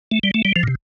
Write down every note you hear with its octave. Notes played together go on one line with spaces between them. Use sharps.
A3
G3
A3
G3
F3
A#2
C3